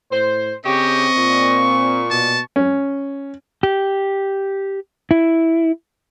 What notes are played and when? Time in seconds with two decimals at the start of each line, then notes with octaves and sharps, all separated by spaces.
0.11 A2 C5
0.65 C#3 C4 G4 D#5 C#6
1.16 A#2
2.11 B2 A5
2.56 C#4
3.63 G4
5.11 E4